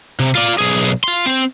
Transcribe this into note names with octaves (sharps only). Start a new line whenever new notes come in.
C3
F4 D5
B1 G#4
F4 C6
C4